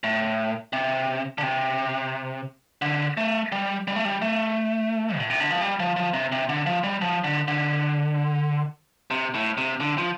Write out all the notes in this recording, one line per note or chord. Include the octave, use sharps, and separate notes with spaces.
A2
C3
D3
C3
D3
A3
G3
G3
A3
G3
A3
A2
C3
D3
F3
G3
F3
F3
C3
C3
D3
F3
G3
F3
D3
D3
C3
A2
C3
D3
F3